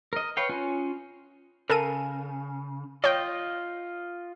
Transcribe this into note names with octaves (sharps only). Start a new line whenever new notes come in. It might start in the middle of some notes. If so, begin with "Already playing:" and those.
A#4 D#5
B4 C#5 F5 G5
C#4 F4 G#5 F#6
C#3 A4 A#4 D#7
F4 C#5 D#5 G5